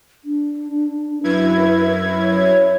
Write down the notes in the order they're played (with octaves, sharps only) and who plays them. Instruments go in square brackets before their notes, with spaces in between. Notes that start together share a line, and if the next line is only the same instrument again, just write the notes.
[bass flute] D4
[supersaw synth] F#2 E4 G#6 [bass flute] B4
[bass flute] C#5